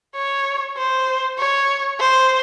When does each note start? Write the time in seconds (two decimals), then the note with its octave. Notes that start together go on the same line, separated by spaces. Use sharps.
0.16 C#5
0.78 C5
1.39 C#5
1.99 C5